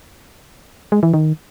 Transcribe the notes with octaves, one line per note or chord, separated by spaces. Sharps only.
G#3
E3
D#3